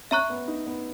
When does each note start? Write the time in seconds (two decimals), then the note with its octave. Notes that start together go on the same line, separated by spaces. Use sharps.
0.11 C#4 E5 A#5 C#6 F#6
0.30 B3
0.48 D#4
0.66 B3